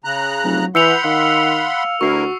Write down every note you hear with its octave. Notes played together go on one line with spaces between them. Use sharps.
C#3 A#5 F#6
F1 F#3
E3 F#5 B5 C6 E6 G6 C#7 F7
D#3 F5
D2 E4 F#4 A#4 C#6 C7